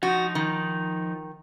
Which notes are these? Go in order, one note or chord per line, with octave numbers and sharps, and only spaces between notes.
F3 D#4 F#4
D#3